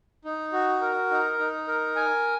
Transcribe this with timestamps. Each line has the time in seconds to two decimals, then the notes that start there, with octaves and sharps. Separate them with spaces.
0.25 D#4
0.52 F#4
0.82 A#4
1.11 D#4
1.39 D#4
1.67 A#4
1.96 G#5